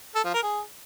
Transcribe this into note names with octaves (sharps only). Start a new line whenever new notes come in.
A4
F3
A#4
G#4